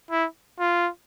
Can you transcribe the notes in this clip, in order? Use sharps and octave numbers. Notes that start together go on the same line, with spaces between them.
E4
F4